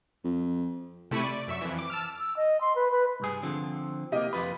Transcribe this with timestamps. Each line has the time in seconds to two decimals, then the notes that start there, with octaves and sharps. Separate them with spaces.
0.24 F2
1.11 C3 A3 E4 B5 C#6 D#7
1.23 D5
1.47 F#2 E5 C#6
1.61 F2 E3
1.78 D6
1.90 A5 E6 F6
2.19 E6
2.36 D#5
2.61 C6
2.76 B4
2.91 B4
3.20 C2 G2 G#4
3.43 D3 F3 C4
4.12 C3 A#3 G4 D#5
4.33 F2 F4 B4